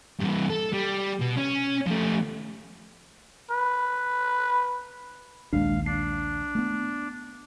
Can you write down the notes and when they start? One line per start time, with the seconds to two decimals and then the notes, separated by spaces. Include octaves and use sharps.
0.20 G2 E3
0.50 A4
0.73 G3
1.21 B2
1.37 C#4
1.87 F3 A3
3.51 B4
5.53 A#1 D#2 G#3 D4 F5
5.86 D4 C7
6.55 A3 B3